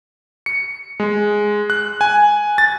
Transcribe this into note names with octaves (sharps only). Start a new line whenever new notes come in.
C#7
G#3
F#6
G#5
A6